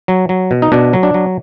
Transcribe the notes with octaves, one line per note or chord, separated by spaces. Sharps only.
F#3
F#3
B2
D#4
B2 D4
F#3
D4
F#3